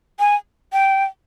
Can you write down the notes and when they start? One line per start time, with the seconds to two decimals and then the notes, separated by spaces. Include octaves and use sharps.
0.19 G#5
0.73 G5